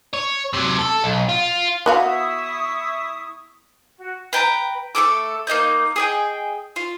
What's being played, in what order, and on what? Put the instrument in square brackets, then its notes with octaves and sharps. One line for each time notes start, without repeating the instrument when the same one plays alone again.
[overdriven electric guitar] C#5
C3 F#3
A4
B1
F4
[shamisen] B3 F#4 F5 [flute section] E4 C#6 D#6
[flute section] F#4
[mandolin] B4 G5 A5 A#5
A3 C#4 A4 D6
A#3 D#4 D#5 G6
G#4 D#5 G5
F4